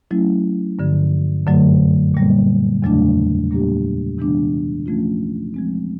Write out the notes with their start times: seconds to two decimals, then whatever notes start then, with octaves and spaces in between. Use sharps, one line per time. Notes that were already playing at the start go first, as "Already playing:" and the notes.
0.11 F#3 A3 C#4 E4
0.79 G2 D3 F3
1.47 F#2 D3 F#3 A3
2.14 A#2 G3 A#3
2.82 E2 C#3 F#3 A3 D4
3.51 A#2 G3 A#3 D4 G4
4.18 C3 E3 G#3 B3 D4
4.86 F3 A3 C#4 F4
5.54 F3 G#3 C4